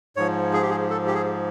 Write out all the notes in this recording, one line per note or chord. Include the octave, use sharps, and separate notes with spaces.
G#2 F3 C#5
G#4
G4
G#4
A4
G4
G#4